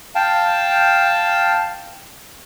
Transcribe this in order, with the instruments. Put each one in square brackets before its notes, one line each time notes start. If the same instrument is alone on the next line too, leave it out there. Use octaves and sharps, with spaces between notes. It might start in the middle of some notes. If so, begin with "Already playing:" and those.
[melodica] F5 G5 A5